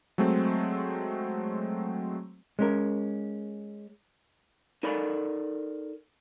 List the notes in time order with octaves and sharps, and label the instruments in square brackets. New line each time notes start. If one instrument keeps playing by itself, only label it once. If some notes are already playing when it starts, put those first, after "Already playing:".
[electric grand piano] F#3 G#3 A3 C4
[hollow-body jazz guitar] G#3 C#4 A#4
[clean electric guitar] D#4 A4 A#4 D5 B5